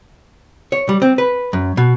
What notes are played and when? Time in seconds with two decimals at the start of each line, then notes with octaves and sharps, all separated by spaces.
0.72 C#5
0.89 G3
1.02 C4
1.18 B4
1.53 F#2
1.77 B2